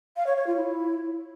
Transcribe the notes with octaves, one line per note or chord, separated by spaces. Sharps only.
F5
C#5
C#5
F4
E4